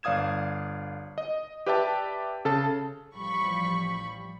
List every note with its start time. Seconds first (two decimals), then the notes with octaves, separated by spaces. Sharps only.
0.03 G1 D5 F5 D#6 G#6 E7
1.18 D#5
1.66 G4 B4 D5 E5 G5 A5
2.45 C#3 A4 A5
3.15 A1 F3 G3 B5 C#6